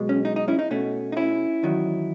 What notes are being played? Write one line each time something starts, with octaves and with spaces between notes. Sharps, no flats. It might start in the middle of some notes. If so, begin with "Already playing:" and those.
Already playing: B1 B2 G#3
C#4
D#4
D#4
C#4 E4
D#4
B2 A3 C#4
D#4
C#4 E4
E2 D#3 F#3